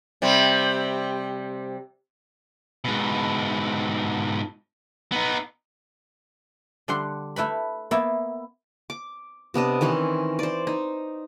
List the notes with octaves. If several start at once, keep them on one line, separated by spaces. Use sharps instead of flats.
C3 G3 C4
G#2 B2
B3 D#4
D3 G3 F#5 C6
A3 E4 B4 B5
A#3 B3 E4
D6
C3 B3 D4 D#5
D#3 E3 C4 C#4
C5 D5
D#4